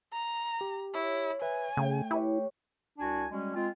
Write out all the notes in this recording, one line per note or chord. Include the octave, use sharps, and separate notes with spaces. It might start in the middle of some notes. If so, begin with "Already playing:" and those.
A#5
G4
E4 C#5
B4 E5 G#5
C#3 A3 G5
E4 G4 B4 C#5
C2 D4 F#4 G#5
G3 G#3 C#4 F#4
G#3 C4 F4